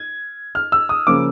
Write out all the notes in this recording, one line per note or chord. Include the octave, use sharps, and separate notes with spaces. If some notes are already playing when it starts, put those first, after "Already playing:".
Already playing: G#6
F6
E6
D#6
C#3 F3 A#3 D6